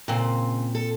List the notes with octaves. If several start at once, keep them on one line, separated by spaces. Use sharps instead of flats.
A#2 C#3 C4
A4